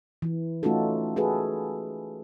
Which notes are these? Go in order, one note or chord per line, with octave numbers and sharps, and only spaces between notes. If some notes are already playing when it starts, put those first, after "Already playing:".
E3
A3 C#4 D#4 F4 F#4 A4
F#4 G#4 A4 B4